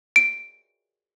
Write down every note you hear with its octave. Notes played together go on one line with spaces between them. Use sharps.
D7